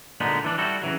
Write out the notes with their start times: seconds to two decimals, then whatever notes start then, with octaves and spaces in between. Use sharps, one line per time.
0.20 A#2 D3 G#3 B3 D#4
0.44 E3 D4
0.58 G3 E4 F#4 A4
0.82 C#3 E3 F#3